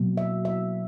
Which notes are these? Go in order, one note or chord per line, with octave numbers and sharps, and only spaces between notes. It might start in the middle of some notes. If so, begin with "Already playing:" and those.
Already playing: B2 F#3 A#3
E5
E5